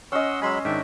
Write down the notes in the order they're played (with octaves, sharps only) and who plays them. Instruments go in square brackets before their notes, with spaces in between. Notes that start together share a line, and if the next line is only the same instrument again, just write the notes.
[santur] C#4 D#5 [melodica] F#5 C6 E6
[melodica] F#3 G#3 B5 [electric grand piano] G#5 C6 E6
[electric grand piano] G#2 D#3 [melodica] D4 E5 G5